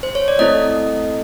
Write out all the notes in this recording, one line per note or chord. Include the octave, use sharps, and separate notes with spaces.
C5
C#5
D5
A3 C4 E4 A4 D#5